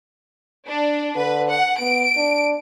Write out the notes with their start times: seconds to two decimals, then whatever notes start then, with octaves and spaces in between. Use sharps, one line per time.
0.66 D4
1.17 D3 B4
1.49 F#5
1.80 B3 D7
2.17 D4